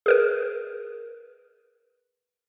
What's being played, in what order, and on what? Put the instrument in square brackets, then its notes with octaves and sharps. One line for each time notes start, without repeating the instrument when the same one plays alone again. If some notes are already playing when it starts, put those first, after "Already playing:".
[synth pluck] G#4 A#4 B4